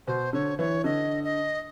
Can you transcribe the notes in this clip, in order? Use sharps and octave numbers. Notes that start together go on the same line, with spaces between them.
B2 C5
D3 C#5
E3 C#5
D3 D#5
D#5